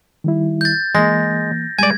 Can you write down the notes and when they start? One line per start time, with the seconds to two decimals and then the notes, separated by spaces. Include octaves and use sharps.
0.24 D#3 G3 E4
0.61 G6 A6
0.95 E3 G#3 A#3 A#6
1.79 G3 G#3 D5 G#5 G#6